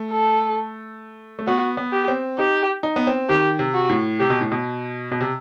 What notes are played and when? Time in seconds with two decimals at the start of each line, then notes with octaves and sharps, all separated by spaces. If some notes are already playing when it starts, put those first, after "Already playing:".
Already playing: A3
0.11 A4
1.39 A3
1.47 B3 F#4
1.77 B3
1.93 G4
2.08 C4
2.38 D#4 G4
2.83 D#4
2.96 B3
3.07 C4
3.29 D#3 G4
3.59 C3
3.74 F#4
3.89 A2
4.20 C3 G4
4.30 B2
4.41 A2
4.51 B2
5.12 B2
5.21 C3